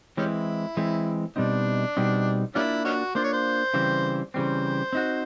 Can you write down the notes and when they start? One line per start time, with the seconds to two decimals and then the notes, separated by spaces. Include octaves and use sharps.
0.17 E3 G3 G#3 C4 C#4 E4
0.77 E3 G#3 C4
1.36 B2 G3 C4 D4 D#4
1.97 B2 G3 C4 D#4
2.55 G3 A#3 C#4 D4 E4 F4
2.85 C#4 D#4 F#4
3.15 A#3 D4 F4 C5
3.24 C#5
3.33 C5
3.74 C#3 E3 G3 C4
4.34 C#3 E3 G3 C4 C5
4.93 C4 D#4 F#4